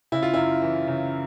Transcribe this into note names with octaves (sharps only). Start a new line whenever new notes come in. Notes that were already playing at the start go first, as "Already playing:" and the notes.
C#3 E4
F4
F#2 E4
E3
C#3